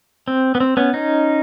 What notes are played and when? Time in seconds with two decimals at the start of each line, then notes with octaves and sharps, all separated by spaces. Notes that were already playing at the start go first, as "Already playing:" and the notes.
0.28 C4
0.55 B3
0.60 C4
0.77 B3 C#4
0.93 C#4 D#4